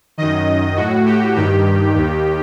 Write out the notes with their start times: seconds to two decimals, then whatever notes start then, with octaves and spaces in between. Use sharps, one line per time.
0.18 F#2 D#3 D#5
0.76 A2 F#4
1.06 G4
1.36 G2 D#3 G4
1.95 D#2 D#3